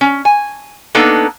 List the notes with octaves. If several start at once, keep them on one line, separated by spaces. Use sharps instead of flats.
C#4
G#5
A#3 B3 D4 D#4 A4